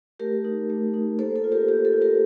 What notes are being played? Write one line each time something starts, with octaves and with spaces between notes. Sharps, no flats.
A3 G4 A#4
D#4
A3
D#4
A#3 A4 C5
A4
F4
G4 A#4
A#3 G4
A4
F4
G4 A#4